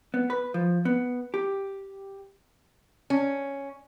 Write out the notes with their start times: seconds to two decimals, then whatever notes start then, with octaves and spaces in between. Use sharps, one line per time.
0.14 B3
0.30 B4
0.54 F3
0.85 B3
1.34 G4
3.10 C#4